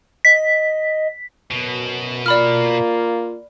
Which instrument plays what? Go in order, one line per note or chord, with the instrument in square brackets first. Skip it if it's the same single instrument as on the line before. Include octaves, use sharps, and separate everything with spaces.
[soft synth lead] D#5 [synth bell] B6
[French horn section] F#2 B3 [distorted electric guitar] B2
[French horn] A#3 [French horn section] F4 [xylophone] D5 B5 F6